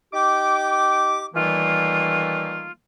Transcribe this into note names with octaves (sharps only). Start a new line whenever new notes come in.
D#4 G4 G5 D6
D#3 E3 G3 A3 A#3 F4